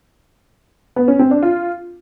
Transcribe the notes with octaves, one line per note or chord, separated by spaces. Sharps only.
B3
C#4
C4
D4
F4